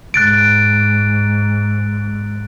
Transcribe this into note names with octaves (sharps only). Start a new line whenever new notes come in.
G#2 F#6 A6 D7